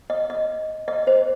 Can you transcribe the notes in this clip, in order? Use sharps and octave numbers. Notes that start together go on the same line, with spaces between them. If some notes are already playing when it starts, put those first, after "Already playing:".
D#5
D#5
D#5
C5